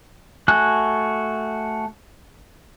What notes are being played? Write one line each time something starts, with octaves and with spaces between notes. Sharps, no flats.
A3 F#4 G#5 F#6